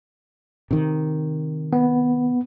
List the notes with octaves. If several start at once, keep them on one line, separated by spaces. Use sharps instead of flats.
C3 D#3
B3